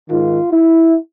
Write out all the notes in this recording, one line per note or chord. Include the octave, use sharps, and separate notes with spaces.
G#2 D#3 F4
E4